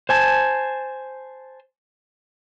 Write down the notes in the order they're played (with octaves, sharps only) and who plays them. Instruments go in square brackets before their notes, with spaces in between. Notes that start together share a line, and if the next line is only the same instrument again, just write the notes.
[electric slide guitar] C5 G#5 A5